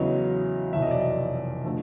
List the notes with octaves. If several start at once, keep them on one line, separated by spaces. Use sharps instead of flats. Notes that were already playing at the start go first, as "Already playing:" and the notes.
Already playing: E2 C#3 F#3 B3 D#5
F1 E2 B2 F#3 E5
D#5
D5
D#5
D3 F3 A3